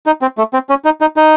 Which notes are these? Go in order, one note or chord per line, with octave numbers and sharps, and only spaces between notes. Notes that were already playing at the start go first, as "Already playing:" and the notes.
D#4
C4
A3
C4
C#4
D#4
D#4
D#4